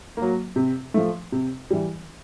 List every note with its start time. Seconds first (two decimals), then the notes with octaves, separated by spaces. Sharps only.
0.17 F#3 A#3
0.56 C3
0.94 F3 A3
1.32 C3
1.71 E3 G3